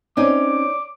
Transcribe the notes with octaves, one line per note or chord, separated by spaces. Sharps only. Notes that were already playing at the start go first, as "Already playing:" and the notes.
C4 C#4 D#4 C#5 D5 D6